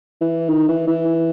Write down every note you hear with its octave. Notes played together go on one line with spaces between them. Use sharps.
E3
D#3
E3
E3